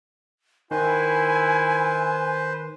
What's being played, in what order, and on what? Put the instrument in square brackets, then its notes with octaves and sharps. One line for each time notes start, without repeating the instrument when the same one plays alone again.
[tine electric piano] D#3 [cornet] E4 [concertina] B4 C5 [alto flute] G#5